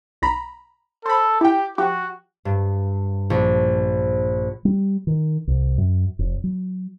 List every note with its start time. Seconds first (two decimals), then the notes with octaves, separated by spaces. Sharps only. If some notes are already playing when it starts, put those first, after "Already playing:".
0.22 B1 A#5 B5
1.06 A4 C5 B5
1.41 E4 G4 G5
1.78 F3 F#4 G4
2.45 G2
3.30 A#1
4.65 G3
5.07 D#3
5.47 C2
5.78 F#2
6.19 F1
6.44 F#3